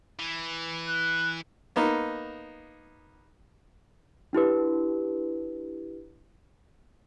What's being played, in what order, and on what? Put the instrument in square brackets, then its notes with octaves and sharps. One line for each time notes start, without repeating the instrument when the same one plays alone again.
[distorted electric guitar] E3
[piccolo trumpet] F#6
[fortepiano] A#3 B3 D#4
[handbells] D4 E4 G4 B4